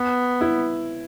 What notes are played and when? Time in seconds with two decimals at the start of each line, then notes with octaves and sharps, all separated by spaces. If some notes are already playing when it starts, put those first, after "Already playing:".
Already playing: B3
0.41 E4